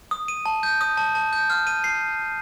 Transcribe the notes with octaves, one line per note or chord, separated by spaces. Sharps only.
D#6
D#7
A5
G6
D#6
A5
A5
G6
F6
D#7
C7